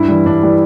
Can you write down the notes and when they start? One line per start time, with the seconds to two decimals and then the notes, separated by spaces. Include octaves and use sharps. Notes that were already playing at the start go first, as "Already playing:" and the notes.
Already playing: G2 E4
0.08 E3 G3
0.26 G2 D4
0.43 E3 G3